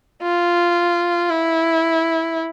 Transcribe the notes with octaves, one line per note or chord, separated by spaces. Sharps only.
F4
E4